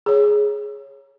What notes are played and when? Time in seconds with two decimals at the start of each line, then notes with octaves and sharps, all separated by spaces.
0.06 G#4 C#5